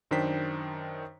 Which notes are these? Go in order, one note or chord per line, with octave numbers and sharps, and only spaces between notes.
F#2 D#3 D4 C5 G5 B6